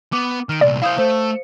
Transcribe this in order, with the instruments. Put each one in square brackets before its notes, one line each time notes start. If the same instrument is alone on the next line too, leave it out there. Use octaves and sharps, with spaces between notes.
[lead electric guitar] B3 [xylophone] D6
[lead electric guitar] D#3 [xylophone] F6 D7
[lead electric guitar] C2 A#2 [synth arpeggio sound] D5
[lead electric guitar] E4 C5 [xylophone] F5 D#6 G6
[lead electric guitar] A3 [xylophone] C5